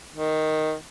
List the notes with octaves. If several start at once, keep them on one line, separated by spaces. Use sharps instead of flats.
D#3